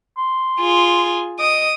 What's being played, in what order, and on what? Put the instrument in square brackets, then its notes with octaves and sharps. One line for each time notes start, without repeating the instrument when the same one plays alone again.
[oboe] C6
[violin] F4 G#4
[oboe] D#5 [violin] D#6 D7